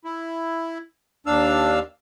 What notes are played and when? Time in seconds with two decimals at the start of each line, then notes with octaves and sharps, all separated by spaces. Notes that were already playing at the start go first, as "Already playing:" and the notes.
0.05 E4
1.26 D#2 D4 F5 E6